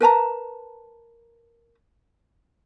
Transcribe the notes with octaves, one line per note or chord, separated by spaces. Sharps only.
A#4 B4 A5 A#5